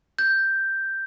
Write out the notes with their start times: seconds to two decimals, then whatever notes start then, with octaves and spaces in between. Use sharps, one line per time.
0.19 G6